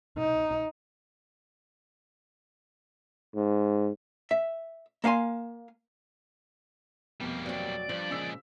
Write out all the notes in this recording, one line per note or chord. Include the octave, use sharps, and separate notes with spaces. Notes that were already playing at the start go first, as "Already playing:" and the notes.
D#4
G#2
E5
A#3 F5 F#5 G#5 C6
F1 B2 G3 A#3
F#3 C4 D5
B1 G2 F3
A#2 C#3 G#3 E6 B6